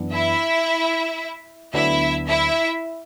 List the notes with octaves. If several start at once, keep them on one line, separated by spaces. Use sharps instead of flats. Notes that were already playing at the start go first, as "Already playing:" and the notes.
Already playing: F#2 E3 B3 D4
E4 E5
D2 D3 F#3 B3 D4 E4 E5
E4 E5